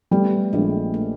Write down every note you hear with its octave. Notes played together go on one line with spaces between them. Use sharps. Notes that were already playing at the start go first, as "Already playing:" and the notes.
G3 A3 B3
A#1 G#3 A#3
A3